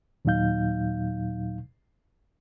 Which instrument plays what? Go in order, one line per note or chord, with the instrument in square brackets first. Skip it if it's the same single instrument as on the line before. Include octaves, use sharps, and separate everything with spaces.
[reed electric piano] D#2 A#2 F#3 D#4 F5 G6